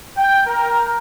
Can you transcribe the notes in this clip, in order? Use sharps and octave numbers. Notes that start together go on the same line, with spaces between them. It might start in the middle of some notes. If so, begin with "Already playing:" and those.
G5
A#4